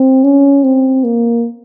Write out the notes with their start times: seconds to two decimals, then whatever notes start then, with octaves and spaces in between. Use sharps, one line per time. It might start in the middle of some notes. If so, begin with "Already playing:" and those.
Already playing: C4
0.24 C#4
0.64 C4
1.04 A#3